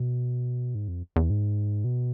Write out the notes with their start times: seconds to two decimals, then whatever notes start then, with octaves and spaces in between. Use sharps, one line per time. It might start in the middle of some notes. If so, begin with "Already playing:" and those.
Already playing: B2
0.75 G#2
0.88 F2
1.16 E2
1.30 G#2
1.84 B2